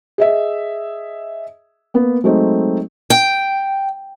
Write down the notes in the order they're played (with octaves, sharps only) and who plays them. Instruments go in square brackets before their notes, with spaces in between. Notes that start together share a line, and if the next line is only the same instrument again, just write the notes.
[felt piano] G#4 D#5 E5
A#3 B3
F#3 G#3 A3 C4 D#4
[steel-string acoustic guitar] G5